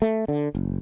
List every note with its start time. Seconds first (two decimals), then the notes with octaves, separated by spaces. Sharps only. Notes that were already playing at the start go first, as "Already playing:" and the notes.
0.02 A3
0.28 D3
0.55 F#1